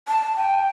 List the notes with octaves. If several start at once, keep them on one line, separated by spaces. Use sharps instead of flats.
A5
G5